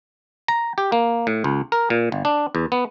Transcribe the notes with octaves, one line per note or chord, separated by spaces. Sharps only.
A#5
G4
A#3
A2
C#2
A#4
A#2
G1
D4
E2
B3